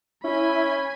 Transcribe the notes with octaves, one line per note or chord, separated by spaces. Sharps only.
C#4 E4 G#5 B5